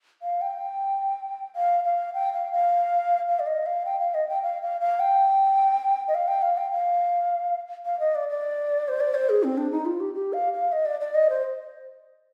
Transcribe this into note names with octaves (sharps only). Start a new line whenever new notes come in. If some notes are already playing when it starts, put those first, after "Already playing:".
F5
G5
F5
F5
G5
F5
F5
F5
D5
D#5
F5
G5
F5
D#5
G5
F5
F5
F5
G5
D#5
F5
G5
F5
G5
F5
F5
D#5
D5
D5
C5
D5
C5
G#4
C4
D4
D#4
F4
G4
G4
F5
F5
D#5
D5
D5
D#5
C5